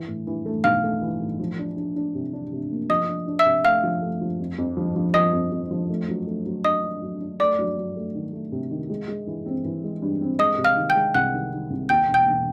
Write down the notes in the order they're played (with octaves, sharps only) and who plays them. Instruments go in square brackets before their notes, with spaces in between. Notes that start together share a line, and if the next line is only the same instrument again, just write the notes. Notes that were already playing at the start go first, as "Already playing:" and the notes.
Already playing: [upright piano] E3
A2
E3
A3
[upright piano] B1 [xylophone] F5 F6
[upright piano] A3
E3
A2
F3
D4
D4
D4
C3
D4
C3
A#3
[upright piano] F3 [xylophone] D#5 D#6
[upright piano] D4
D4
[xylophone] E5 E6
[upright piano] C3
[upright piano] A3 [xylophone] F5 F6
[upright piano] F3
A3
F3
F2
F2
F3
F3
[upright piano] F3 [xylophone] D#5 D#6
[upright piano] F2
F2
F3
A3
F#3
A3
F#3
[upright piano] D4 [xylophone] D#5 D#6
[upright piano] D4
F#3
D4
[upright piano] A3 [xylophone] D5 D6
[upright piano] F#3
F#3
A3
D#3
A3
C3
D#3
G#3
G#3
E3
C4
E3
G#3
G2
C4
[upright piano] G#3 [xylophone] D#5 D#6
[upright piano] C3
[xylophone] F5 F6
[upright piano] D#3
[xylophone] G5 G6
[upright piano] G#3
[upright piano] C2 [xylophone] F#5 F#6
[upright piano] D#3
D#3
C2
[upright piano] D#2 [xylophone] G5 G6
[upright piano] E1
[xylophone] G5 G6
[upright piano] E1